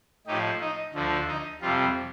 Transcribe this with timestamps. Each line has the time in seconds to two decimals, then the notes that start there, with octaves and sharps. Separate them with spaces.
0.27 A2 F3 D#4 G4
0.60 D#4
0.94 D2 D3 F3
1.27 D#4
1.61 F2 C3 G3 F4